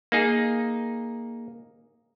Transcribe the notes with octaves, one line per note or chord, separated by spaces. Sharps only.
A#3 D#4 G#4